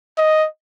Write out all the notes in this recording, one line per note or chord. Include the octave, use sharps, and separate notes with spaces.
D#5